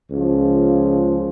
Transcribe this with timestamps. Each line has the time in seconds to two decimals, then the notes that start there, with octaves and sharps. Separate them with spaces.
0.11 C#2 C#3 F3